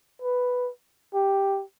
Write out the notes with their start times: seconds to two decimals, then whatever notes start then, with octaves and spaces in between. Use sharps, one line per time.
0.22 B4
1.14 G4